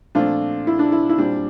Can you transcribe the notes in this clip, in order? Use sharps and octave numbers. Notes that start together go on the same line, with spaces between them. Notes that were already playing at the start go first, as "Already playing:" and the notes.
A#2 F3 A3 C4 D4 F4
E4
D4
E4
E4
A#2 G3 C4 D4